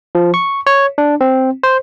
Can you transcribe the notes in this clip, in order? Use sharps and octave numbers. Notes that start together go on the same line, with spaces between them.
F3
C#6
C#5
D4
C4
C5